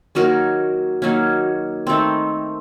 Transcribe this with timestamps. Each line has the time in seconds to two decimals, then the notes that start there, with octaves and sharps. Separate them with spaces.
0.15 D#3 F#3 A#3 C#4 F#4 A#4
1.02 D#3 F#3 A#3 C#4
1.87 D#3 A3 C4